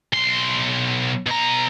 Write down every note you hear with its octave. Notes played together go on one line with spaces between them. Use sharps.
B1 C6
B2 A#5